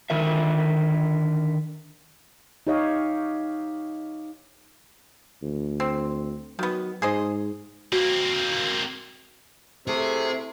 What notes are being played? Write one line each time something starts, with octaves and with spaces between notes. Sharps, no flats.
D3 D#3 A#4 E5
D#4 G4 C#5 D#5 F5
D2
C4
D#3 F#3 B3
G#2 G#4 C5 D#5
A#3 C4 F#4
C3 A3 E4 G#4